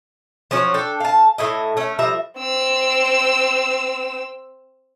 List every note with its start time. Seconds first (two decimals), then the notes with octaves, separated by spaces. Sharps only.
0.51 F3 F#3 C#4 F#4
0.74 D4 A4 G5
1.00 F5 A5
1.38 A2 E4 D#5
1.77 A3 C#4
1.99 F3 G3 E5 A#5
2.39 C4 E6